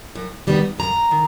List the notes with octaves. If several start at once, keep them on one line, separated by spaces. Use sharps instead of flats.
F#2
D#3 G3 B3
F#2 A#5
D#3